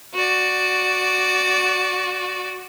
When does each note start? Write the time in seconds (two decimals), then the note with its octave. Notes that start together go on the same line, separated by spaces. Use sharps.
0.14 F#4 D5